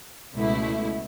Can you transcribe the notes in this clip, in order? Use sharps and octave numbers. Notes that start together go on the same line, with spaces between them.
C#2 B2 A3 E4